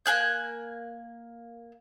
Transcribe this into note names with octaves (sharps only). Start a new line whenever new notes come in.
A#3 G#5 F#6 G6